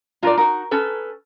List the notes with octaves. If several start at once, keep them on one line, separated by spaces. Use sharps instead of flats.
A#2 D4 F4 A#4 D5 A#5
D#4 F#4 A#4
C#4 A4 B4